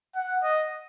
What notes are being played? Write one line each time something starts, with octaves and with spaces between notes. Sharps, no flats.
F#5
D#5